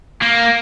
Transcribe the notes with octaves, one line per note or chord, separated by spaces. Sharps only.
A#3